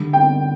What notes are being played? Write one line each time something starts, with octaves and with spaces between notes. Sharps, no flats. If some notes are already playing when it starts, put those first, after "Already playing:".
Already playing: D3 G3 D4
G5